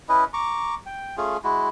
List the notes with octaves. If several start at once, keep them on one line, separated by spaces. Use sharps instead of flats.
C#4 E4 B4 D#5
A#5 C#6 D6
G5
A3 C#4 F4 G#4
G#3 E4 F#4